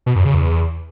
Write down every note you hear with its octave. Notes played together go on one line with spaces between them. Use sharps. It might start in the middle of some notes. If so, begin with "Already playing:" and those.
B2
F#2
C#3
E2